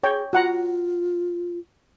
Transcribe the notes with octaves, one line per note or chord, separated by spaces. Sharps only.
G#4 C#5 G5
F4 F#4 F#5 A#5